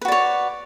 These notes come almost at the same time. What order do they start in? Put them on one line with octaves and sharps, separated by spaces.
B4 F#4 D5 C#5